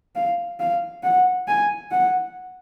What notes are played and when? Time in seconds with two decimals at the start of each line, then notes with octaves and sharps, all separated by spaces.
0.16 F5
0.60 F5
1.03 F#5
1.48 G#5
1.91 F#5